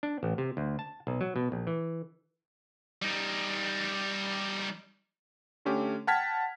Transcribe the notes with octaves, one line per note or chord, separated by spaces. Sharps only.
D4
A1
C3
D2
A5
B1
F#3
B2
A#1
E3
G3 D#4
D3 A3 C#4 G4
F#5 G5 A5 F6 G#6 B6